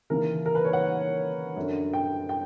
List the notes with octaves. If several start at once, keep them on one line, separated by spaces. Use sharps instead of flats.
D#2 C#3 E3 A#4
A#4
B4
C#5
F#5
F#2 D3
G5
G5